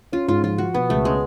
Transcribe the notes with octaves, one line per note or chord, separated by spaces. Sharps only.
C#4 F4
G#2 F4
F3 F4
F3 F#4
B2 B3
C#2 A3
G#3 C#4